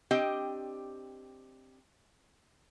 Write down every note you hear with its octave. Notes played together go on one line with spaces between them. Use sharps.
C4 D4 G4 D#5 G5